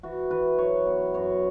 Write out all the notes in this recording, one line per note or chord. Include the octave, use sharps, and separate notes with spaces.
E3 F#4
E3 B4
F#3 C#5
B3
F#2 C#5